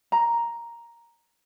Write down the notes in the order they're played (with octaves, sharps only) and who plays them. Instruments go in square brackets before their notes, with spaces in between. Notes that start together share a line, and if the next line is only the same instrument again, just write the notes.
[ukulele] A#5